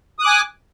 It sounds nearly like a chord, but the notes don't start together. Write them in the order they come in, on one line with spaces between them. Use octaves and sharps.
D#6 F#6 D6 G#5